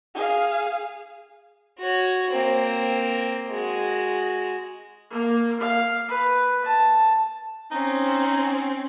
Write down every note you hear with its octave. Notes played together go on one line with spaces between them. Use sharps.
G#4 F5
F#4 C#5
A#3 C4
G#3 F#4
A#3
F5
B4
A5
C4 C#4 D#4